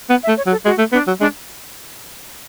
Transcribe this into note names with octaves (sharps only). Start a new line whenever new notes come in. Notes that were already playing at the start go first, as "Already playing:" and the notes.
B3 F#5
E5
A3
C#5
F#3
A4
G#3 F#4
A3
B3 D4
F#3
G#3 D4